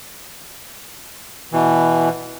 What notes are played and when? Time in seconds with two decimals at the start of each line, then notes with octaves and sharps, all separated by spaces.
1.52 B2 E3